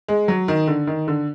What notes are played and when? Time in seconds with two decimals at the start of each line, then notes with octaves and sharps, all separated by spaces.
0.08 G#3
0.28 F#3
0.48 D#3
0.68 D3
0.87 D#3
1.08 D3